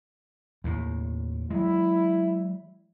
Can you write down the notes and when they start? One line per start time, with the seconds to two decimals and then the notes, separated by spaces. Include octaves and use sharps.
0.64 D#2 A2
1.50 F#3 G#3 E4